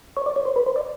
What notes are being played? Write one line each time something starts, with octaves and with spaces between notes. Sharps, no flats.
C#5
D5
C#5
C5
B4
C5
D5